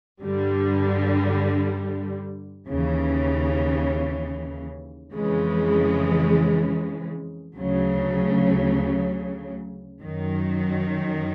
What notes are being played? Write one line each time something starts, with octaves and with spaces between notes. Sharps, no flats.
G2 D3 G3
D#2 C#3 E3
F2 C#3 E3 G#3
D2 C#3 F#3
F#2 D#3 F#3